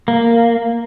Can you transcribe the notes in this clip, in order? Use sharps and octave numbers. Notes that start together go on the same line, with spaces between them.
A#3